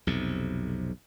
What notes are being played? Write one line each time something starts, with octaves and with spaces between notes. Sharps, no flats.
B1 F2 C3